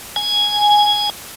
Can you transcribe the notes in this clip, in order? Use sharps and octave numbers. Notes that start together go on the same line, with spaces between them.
G#5